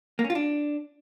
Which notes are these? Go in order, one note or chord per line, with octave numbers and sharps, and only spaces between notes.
A#3
C#4
F4
D4